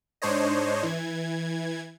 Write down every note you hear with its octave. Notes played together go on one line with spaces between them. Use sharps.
G#2 D4 C5 C#5 D#5
E3 G#6